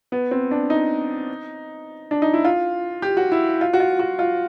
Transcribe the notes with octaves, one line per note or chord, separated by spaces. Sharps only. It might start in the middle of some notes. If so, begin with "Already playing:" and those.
B3
C4
D4
D#4
D4
D#4
E4
F4
G4
F#4
E4
F4
F#4
F4
F#4
F4